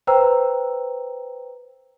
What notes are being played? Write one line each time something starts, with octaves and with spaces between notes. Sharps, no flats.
B4 C5 G5 A#5 E6